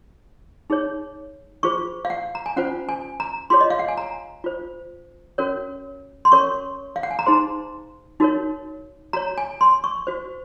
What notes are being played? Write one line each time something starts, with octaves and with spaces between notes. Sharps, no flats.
D#4 G#4 C#5
F4 G#4 C5 C#6
F5
F#5
A#5
G#5
C#4 F4 C5 F#5
G#5
A#5
F4 G#4 C#5 C6
D#5
F5
F#5
G#5
A#5
F4 C5
C#4 F#4 A#4 C#5
C6
C#4 F#4 A#4 C#5 C#6
F5
F#5
G#5
A#5
D#4 G#4 C5 C6
D#4 F#4 A#4 C#5
F#4 C#5 A#5
G#5
C6
C#6
F#4 C5